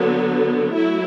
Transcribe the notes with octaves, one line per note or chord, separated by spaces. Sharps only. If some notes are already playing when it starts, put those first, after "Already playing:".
Already playing: D3 F#3 B3
F#3 A3 E4